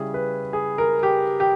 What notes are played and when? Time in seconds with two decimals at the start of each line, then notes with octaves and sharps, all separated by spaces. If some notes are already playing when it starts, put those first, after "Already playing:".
Already playing: C#3 G3 C#4 E4 G#4
0.14 B4
0.53 G#4
0.78 A#4
1.03 G4
1.40 G4